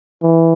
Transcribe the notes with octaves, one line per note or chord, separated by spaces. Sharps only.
E3